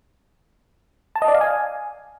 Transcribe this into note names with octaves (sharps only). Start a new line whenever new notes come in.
A5
D#5
D5
F5
G#5